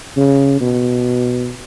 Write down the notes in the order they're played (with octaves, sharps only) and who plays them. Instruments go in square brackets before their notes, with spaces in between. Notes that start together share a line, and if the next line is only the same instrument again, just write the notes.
[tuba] C#3
B2